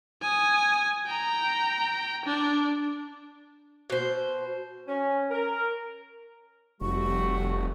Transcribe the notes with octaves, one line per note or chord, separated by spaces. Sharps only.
G#5 D#6
G5 A#5
D4
B2 C5
C#4
A#4
F1 G3 A3 F#4 C#6